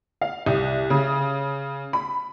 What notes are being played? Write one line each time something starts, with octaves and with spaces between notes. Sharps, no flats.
F5
C2
C#3
B5